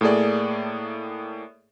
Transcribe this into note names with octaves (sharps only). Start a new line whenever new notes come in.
A2 A3 A#3 G#4 D5